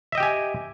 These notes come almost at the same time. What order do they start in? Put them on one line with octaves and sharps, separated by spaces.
E5 D#5 G5 G4 G#5